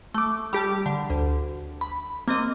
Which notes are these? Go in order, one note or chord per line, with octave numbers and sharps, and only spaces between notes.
A3 D6
G3 G4 A5
D3
D2
B5
A#3 C4 D#5